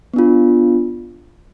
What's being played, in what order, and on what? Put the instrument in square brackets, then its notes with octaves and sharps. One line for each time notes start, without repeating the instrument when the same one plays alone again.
[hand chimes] B3 D4 F4